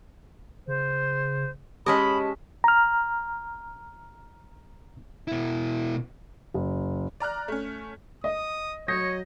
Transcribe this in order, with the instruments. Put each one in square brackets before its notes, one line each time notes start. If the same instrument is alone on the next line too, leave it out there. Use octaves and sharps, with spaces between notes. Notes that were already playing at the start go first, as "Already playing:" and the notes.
[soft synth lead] C#3 [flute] C5
[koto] G#3 C#4 D#5 [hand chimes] G4 B6 [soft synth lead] A5 [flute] B5
[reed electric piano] A#5 F6
[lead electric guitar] B2 E4
[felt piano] F#1
[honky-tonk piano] D5 A#5 F6 F#6
A3 C#4
[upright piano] D#5 [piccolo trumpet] D#6
[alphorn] F#3 [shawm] C#5 [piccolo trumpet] D#5 [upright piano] D#6 G6 A#6